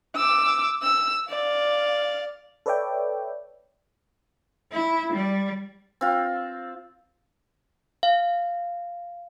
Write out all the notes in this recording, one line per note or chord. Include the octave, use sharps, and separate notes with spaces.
D6 E6
E6
D5 F5
A4 B4 C#5 D5 E5 G5
E4
G3
C4 F4
F5